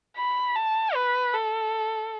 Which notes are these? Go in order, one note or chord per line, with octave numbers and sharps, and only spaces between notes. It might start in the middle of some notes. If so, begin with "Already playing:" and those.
B5
A5
B4
A4